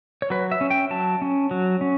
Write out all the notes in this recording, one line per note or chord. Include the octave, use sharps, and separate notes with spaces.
C#5
F#3 B4
E5
C#4
G5
F#3 A5
C#4
F#3
C#4